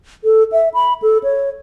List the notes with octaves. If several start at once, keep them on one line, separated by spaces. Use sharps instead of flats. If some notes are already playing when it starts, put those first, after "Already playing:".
A4
E5
B5
A4
C#5